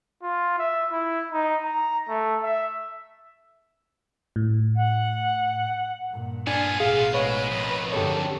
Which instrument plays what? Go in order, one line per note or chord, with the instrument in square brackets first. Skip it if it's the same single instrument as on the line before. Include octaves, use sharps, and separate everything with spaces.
[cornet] F4
E5
E4
D#4
A#5
A3
E5
[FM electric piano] A2
[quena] F#5
[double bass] G2 A#2
[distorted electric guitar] B3 F4 [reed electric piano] D4 [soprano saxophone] G#5
[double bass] A1 B2 [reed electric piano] G#4 [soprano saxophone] F5
[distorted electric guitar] G#2 G#3 [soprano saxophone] B4 [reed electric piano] C#5
[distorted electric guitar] F2 D#3
[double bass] F#2 D3 [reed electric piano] G4 C#5 [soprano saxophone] A4